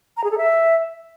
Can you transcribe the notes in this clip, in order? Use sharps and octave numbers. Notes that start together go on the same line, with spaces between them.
A#5
G#4
A4
E5